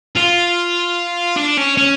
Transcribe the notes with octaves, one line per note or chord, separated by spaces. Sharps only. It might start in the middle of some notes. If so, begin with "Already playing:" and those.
F4
D4
C#4
C#4